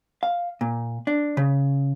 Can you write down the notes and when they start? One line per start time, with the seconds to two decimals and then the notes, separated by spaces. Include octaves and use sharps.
0.23 F5
0.61 A#2
1.07 D4
1.37 C#3